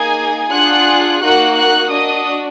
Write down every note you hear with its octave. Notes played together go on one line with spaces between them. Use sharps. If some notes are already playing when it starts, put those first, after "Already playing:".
Already playing: A#3 D#4 G#4 G#5 G#6
D4 F4 G#4 F#5 F#6
A#3 D#4 F#4 F#5 F#6
F#5 F#6
D4 F#4 D#5 D#6